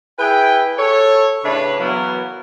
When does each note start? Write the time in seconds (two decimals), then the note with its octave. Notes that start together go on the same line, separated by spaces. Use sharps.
0.19 E4 G#4 B4 G5
0.78 A4 C#5
1.45 A2 C#3 A3 D4 B4 C#5
1.80 E3 F#3 A#3 B3 E4 A#4